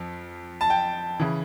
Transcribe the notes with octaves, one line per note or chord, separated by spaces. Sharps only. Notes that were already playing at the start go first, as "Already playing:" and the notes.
Already playing: F2 F3
A5
G5
C#3 E3